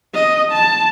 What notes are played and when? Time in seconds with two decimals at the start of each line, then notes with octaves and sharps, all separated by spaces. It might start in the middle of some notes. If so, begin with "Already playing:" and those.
0.14 D#5
0.53 A5